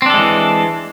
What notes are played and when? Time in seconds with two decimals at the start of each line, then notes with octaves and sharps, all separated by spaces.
0.02 C4
0.06 D4
0.10 A4
0.14 G#3
0.18 E3